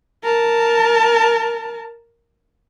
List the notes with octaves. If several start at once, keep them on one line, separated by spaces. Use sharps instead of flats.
A#4 A5